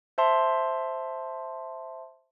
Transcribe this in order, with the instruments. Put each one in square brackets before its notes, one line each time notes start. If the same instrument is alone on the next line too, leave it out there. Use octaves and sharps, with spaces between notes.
[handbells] C5 E5 A5 C6